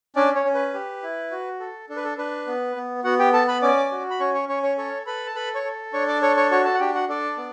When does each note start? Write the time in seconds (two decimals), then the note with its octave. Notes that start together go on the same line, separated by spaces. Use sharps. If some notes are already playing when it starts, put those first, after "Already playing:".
0.16 C#4 D4 D5
0.35 C#4 C#5
0.45 C#4
0.54 B4
0.74 G4
1.03 E4
1.31 F#4
1.60 A4
1.89 D4 A4
1.96 B4
2.04 A4
2.18 D4 B4
2.47 B3
2.76 B3
3.04 B3 F#4 F#5
3.19 G4 G5
3.33 A4 A5
3.48 B4 B5
3.62 C#4 D5 D6
3.92 F#4
4.11 B5
4.20 C#4 C#5 C#6
4.34 C#5 C#6
4.49 C#4 C#5 C#6
4.63 C#5 C#6
4.78 A4 C#5 C#6
5.06 A4 B4 B5
5.26 A5
5.35 A4 B4 B5
5.55 C#5 C#6
5.64 A4
5.93 D4 C#5 C#6
6.08 D5 D6
6.22 A4 C#5 C#6
6.37 C#5 C#6
6.51 F#4 C#5 C#6
6.65 A4 A5
6.75 F#5
6.80 D4 G4 G5
6.94 F#4 F#5
7.09 D4 A4 D5
7.37 B3